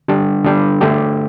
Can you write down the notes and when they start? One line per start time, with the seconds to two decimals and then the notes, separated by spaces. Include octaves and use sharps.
0.08 D3 G3 D4 G4
0.44 D3 G3 D4 G4
0.81 D3 A3 D4 G4